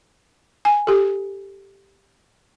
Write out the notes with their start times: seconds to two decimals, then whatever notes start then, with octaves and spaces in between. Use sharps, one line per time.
0.65 G#5
0.87 G4 A4